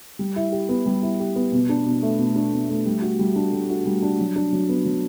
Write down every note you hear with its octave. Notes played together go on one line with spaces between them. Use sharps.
G3
E4
G4
B3
G3
E4
G4
B3
B2
D4
B2
A3
B2
D4
B2
A3
G3
F#4
G3
D4
G3
F#4
G3
D4
F#3
D4
F#3
B3
F#3